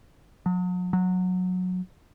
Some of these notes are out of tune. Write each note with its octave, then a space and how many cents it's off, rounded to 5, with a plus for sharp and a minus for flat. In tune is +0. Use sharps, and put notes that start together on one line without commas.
F#3 -40
F#3 -15